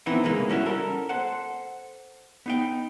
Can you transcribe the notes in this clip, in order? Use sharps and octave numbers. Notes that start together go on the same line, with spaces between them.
E3 B3 C4 D#4 E4
C2 C#3 E3 G#3 A#3
G3 C#4 E4 F#4
A4 A#4
A4 C5 F#5
B3 D#4 G5